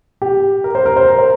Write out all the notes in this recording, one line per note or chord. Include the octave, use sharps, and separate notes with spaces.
G4
A#4
C5
A#4
C5
A#4
C5